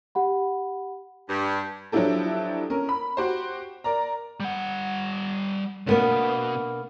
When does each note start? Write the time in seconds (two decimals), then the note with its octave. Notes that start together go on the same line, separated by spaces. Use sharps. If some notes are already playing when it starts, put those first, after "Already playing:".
0.15 G4 F#5 B5
1.29 G2
1.92 F3 F#3 D4 E4 G4 A4
2.70 C#4 A#4
2.89 B5
3.17 F#4 G4 C5
3.84 A#4 D5 A#5
4.40 G3 F#5
5.87 C#2 B2 A#3 B3 D4